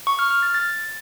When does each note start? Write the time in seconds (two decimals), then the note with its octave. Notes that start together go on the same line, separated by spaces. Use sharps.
0.07 C#6
0.19 F6
0.31 F6
0.43 A6
0.54 A6